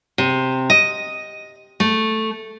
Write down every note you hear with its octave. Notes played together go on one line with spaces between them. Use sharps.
C3
D#5
A3